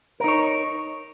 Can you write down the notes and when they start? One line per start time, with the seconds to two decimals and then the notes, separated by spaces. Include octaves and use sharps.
0.20 A#4
0.24 D#4
0.28 C#5